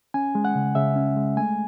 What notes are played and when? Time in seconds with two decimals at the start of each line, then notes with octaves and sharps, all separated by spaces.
0.14 C#4 G#5
0.35 G#3
0.45 F#5
0.55 C#3
0.75 C#3 E5
0.96 C#4
1.16 G#3
1.37 A3 G#5